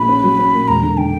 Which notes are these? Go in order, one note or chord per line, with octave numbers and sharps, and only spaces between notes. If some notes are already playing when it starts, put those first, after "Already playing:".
Already playing: A#1 B5
C#4
F#3
C#4
A#2
E1 A#5
D3
D3 G5